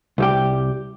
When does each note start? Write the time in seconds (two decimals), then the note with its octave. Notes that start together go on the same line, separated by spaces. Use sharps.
0.18 C2 G3 G4